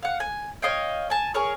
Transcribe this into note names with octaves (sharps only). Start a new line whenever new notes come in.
F5 F#5
G#5
C#5 D#5 F5 G5
G#5 A5
G#4 A#4 C#5